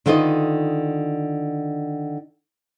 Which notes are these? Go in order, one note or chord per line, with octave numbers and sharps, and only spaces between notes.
D3 D#3 E4 F4 B4 D#5